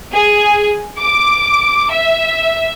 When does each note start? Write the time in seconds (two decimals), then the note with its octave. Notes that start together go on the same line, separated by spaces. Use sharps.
0.12 G#4
0.99 D6
1.92 E5